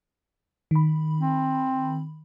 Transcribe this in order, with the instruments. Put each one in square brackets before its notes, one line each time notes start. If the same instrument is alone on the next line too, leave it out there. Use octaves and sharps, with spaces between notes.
[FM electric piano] D#3 B5
[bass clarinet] C4